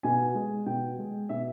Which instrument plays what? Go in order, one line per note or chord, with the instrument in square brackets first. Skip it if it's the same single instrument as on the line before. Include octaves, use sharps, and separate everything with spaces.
[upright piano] B2 G#5
G#3
B2 G5
G#3
B2 E5